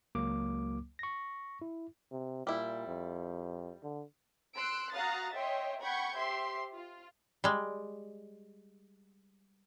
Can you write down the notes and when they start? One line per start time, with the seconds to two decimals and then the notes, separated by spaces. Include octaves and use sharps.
0.15 C#2 F#3 A#3 D6
0.99 C#6 A#6
1.62 E4
2.12 C3
2.47 A#2 G3 E4
2.87 F2
3.83 D3
4.55 C6 E6 F#6 D7
4.93 F#4 F5 A#5 D#6 F#6 A6
5.33 C#5 D#5 E5 G5 C6
5.80 F#5 G5 B5 C#6 G6 G#6
6.16 G4 C5 E5 C6
6.74 F4
7.44 G3 G#3